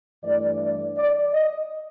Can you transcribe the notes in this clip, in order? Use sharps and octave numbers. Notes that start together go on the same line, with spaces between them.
G2 E3 A3 D5
D5
D5
D#5